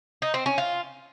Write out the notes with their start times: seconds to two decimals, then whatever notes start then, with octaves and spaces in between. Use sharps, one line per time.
0.22 D#4
0.34 C4
0.46 C#4
0.58 F4